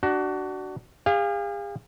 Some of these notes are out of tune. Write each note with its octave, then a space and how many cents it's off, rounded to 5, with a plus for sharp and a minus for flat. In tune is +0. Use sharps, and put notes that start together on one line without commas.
D4 +10 F#4 +25
G#4 -45 F5 +0